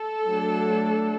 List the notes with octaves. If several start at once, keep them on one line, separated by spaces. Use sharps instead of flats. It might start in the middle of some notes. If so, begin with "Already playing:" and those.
Already playing: A4
F#3 A3 D4